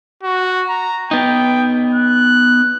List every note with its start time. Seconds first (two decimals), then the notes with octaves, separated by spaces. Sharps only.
0.23 F#4
0.69 A#5
1.11 B3 D#4 G5
1.95 F#6